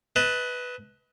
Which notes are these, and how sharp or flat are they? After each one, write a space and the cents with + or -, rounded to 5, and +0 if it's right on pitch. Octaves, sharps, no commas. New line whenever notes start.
B4 +0 D#5 +35 A5 +0